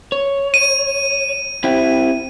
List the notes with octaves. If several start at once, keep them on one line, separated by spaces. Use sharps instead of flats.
C#5
D#7
C4 E4 G4